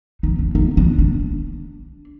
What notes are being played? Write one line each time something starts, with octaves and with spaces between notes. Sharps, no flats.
D#4
D4
D#4
D4
D4